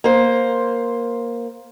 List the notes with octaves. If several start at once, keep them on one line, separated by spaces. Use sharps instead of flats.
A#3 C5